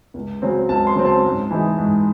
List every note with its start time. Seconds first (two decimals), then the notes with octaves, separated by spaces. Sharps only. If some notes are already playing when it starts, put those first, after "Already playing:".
0.14 C#2
0.42 C#3 F#3 C4
0.69 C#2 A5
0.87 C6
0.96 C#3 F#3 C4
1.05 A5
1.24 G#2
1.51 E3 G#3 D#4
1.77 G#2